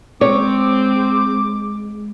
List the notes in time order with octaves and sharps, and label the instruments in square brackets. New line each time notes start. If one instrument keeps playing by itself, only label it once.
[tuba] G#3 [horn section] C4 [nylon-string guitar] C#5 [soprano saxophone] D6